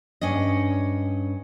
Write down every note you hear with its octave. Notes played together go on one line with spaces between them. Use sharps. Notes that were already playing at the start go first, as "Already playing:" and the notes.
G2 C#4 D4 D#5